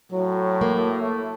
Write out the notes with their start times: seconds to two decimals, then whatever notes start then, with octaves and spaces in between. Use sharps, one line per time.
0.12 A2 F#3
0.61 A#3
1.02 A3